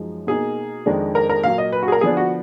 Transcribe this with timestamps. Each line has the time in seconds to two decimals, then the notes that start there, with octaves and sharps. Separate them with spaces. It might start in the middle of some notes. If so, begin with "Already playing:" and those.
Already playing: F#2 F3 G#3 D#4
0.27 B2 A#3 D#4 G#4
0.86 F2 D#3 G#3 D4
1.15 A#4
1.30 A#4
1.43 A#2 F#3 A#3 F5
1.58 D#5
1.72 B4
1.83 F#4
1.88 G#4
1.92 A#4
2.01 D3 F3 B3 D4 G#4
2.17 F#4